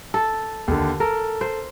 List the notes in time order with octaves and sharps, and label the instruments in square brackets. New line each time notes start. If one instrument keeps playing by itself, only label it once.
[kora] A4
[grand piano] D#2 D3
[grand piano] A4 [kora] A#4
[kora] C5